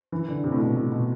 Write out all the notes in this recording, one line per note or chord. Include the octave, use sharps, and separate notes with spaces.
E3
D3
C3
A2
B2
A2
B2